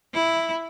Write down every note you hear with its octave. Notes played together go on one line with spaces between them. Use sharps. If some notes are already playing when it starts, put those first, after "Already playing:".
E4